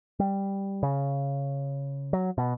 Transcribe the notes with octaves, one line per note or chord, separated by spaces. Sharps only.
G3
C#3
F#3
B2